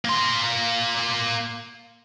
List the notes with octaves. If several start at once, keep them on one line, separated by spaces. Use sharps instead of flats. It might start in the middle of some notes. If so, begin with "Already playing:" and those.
A#3 C6